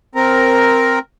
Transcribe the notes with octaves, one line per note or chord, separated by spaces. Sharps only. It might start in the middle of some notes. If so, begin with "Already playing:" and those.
C4 A#4